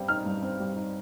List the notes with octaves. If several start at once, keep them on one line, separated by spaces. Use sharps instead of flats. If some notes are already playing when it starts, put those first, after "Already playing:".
Already playing: G2 G3 C4
D#4 F6
G2
C4
G3
D#4